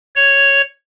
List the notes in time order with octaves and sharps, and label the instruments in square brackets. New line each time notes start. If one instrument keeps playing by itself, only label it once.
[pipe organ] C#5